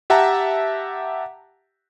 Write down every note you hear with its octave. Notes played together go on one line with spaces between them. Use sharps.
G4 E5 F#5 A5 A#5